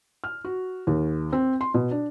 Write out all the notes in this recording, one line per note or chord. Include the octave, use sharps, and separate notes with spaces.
F6
F#4
D#2
C4
C6
B2
D4